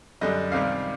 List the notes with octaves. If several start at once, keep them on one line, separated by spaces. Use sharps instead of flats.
F#2 D3 G3 D#5
C#2 C3 D#3 G3 F5